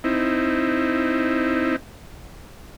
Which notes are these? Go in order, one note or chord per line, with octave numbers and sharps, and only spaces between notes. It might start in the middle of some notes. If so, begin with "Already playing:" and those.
C4 D#4 E4